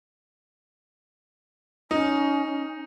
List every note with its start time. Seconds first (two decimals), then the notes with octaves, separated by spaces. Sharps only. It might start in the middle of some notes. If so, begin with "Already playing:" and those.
1.91 C#4 D#4